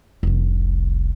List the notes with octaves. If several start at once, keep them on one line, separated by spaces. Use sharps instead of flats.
F1 C2